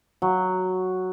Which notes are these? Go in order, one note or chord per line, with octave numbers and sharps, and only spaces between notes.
F#3